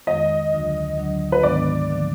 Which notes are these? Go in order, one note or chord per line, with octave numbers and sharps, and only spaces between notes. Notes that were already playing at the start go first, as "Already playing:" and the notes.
F2 D#3 G#3 D#5
D2 D3 F#3 D4 F4
D2 D3 F#3 D4
B4
G#2 D#3 G#3 B3 D4 D5
D3 F3 A#3